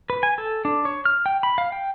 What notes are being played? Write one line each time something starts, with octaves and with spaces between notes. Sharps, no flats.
B4
G#5
A4
D4
C#5
F6
G5
B5
F5
G5